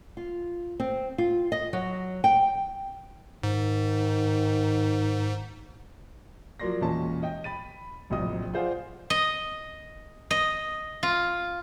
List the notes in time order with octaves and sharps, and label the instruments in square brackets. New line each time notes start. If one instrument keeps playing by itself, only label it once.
[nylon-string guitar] F4
C4
F4
D#5
F#3
G5
[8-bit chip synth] G#2 [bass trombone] D#3
[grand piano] F3 F#3 A#4 D5 C6 A#6
E1 E2 A#2 C#4 D#5 A5
D#5 G5
B5 A6 D#7
D1 A#1 C3 G3 D#5 D#6
F4 G#4 C5 D5 F5 F#5
[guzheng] D#5
D#5
F4